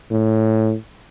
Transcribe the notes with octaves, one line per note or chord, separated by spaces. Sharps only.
A2